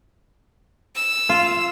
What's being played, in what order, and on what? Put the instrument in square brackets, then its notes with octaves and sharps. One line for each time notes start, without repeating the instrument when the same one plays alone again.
[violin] E6
[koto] F4